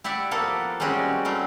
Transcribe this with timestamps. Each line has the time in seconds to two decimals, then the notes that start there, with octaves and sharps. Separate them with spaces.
0.04 E4 G4 D5 E5 F#5
0.31 F3 A#3 B3 A4 F#5
0.80 G3 G#3 C4 C#4 F#4 G4
1.25 F#3 G3 A3 F4